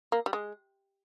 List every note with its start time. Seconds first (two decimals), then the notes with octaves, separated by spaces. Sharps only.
0.12 A#3
0.26 G3
0.33 G#3